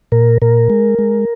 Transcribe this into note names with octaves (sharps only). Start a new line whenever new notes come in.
A#2 A#4
A#2 A#4
G#3
G#3